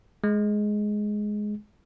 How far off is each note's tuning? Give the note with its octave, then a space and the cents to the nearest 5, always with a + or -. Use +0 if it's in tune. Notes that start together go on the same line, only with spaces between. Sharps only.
G#3 +10